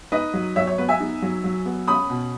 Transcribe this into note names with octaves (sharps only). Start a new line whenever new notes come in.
D#4 B4 D#5
F#3
F#3 C#5 E5
C#5
B3 B4
E5 G#5
D#4
F#3
F#3
B3
C#4 B5 D#6
B2